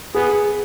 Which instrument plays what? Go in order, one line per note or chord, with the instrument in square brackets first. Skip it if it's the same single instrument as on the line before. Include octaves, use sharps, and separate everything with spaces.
[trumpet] B3 [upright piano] G#4